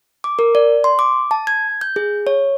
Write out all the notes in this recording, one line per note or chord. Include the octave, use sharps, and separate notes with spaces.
D6
A#4
D5
C6
D6
A5
G#6
G6
G#4
C#5